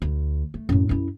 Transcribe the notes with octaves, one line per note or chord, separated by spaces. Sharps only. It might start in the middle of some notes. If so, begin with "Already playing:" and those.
D2
A3
F#2 A2
F#2 E4